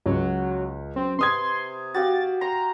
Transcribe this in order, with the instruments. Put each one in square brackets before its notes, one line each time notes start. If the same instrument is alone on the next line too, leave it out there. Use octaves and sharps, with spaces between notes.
[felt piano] C#2 [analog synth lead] F#3
[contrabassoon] F#2 [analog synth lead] C4
[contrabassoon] C3 [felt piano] B4 D#6 G#6 [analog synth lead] C6
[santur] F#4 G4 F5 [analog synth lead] A6
[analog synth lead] A#5 [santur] C6